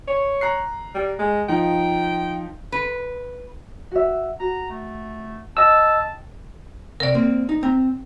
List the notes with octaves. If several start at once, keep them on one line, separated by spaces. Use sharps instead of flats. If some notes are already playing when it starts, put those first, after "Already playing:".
C#5
A#5 F#6 C7
G3
G#3
F3 D#4 F4 G5
B4
F#4 E5
F#4 A#5
A3
D#5 G5 A5 E6
C3 A#4 D5
A#3 C4 C5
D#4
C4 A#5